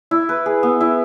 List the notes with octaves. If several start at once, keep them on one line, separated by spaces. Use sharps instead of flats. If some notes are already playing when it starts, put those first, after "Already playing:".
E4
B4
G#4
B3
E4